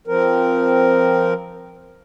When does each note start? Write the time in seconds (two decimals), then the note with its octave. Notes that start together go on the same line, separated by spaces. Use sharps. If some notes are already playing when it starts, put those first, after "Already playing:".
0.08 F3 C4 A#4